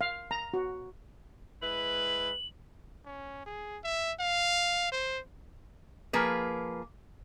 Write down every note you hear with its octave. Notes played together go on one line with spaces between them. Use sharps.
F5
A#5
F#4
G#3 E4 B4 F#7
C#4
G#4
E5
F5
C5
F3 A#3 G#4 B4